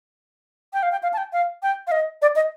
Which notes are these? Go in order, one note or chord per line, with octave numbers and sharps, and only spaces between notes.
G5
F5
G5
F5
A5
G5
F5
G5
F5
D#5
D5
D#5